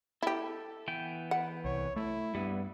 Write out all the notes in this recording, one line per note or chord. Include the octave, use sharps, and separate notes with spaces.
E4 G4 A4
E3 B3 G5
B4 F#5
C2 C#5
A3 E4
G2 G3 B3